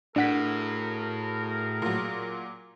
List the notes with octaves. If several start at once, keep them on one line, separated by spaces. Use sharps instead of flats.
A2 D4 F#4 G#4 A#4 F#5 B6
A#2 F#3